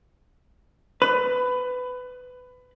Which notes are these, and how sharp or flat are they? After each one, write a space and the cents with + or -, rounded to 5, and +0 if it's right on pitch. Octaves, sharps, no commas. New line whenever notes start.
B4 +20